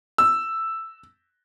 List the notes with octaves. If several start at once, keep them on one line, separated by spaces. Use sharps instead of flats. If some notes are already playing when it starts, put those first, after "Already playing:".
E6